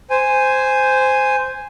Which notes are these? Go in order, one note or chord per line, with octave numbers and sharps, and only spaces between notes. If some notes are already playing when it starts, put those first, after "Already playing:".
C5 G#5